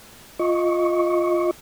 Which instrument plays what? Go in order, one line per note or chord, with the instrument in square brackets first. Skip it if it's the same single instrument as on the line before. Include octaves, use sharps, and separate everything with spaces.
[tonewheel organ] F4 D#5 C#6